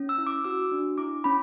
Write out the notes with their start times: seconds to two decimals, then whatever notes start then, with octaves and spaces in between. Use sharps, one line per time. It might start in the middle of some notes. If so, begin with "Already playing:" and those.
Already playing: C#4
0.09 E6
0.18 E4
0.27 D6
0.45 F#4 E6
0.72 D4
0.98 E4 D6
1.24 C#4 B5